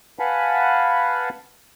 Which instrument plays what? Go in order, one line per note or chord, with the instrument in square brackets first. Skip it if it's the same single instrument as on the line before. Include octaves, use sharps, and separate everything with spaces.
[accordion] B4 F5 F#5 G#5 A5 B5